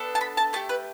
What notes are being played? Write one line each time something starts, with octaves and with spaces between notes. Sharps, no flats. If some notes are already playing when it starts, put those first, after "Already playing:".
Already playing: B3 D4 A4
A5
B5
A5
A3 G4 A5
B4